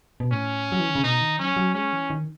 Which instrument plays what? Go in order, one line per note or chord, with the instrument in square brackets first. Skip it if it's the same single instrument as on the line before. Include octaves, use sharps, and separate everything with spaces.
[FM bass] B2
[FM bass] A2 [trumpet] C#4
[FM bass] F#3
E3
D#3
C#3
[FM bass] B2 [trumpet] D#4
[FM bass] D#3
[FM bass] F#3 [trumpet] C#4
[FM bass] F#3
[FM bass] G#3 [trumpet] C#4
[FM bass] E3
D#3